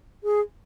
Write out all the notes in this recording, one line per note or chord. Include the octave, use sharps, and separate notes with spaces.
G#4